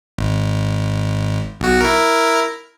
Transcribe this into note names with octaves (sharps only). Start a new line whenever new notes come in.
G#1
B1 F#4
E4 A#4